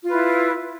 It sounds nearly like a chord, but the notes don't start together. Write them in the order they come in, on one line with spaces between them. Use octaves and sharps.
F4 B4 E4